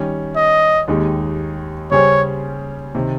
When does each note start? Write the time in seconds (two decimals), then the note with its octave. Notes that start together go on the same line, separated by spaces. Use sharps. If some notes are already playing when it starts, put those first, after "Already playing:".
Already playing: D#3 G3 C#4
0.36 D#5
0.88 D#2 D#3 G#3 D#4 G4
1.91 C#3 G3 C#4 G#4 C5 C#5
2.95 C3 D#3